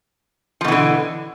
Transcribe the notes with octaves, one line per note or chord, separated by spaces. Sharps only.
B2 D3 E3 F3